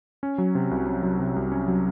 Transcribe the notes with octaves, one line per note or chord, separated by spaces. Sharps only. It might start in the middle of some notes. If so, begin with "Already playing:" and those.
C#4
F#3
C3
C2
C#4
F#3
C3
C2
C#4
F#3